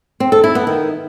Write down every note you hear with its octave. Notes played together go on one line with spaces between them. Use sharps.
C4
A4
E4
B3
D#3